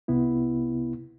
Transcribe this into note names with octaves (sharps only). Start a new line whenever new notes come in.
C2 C3 B3 E4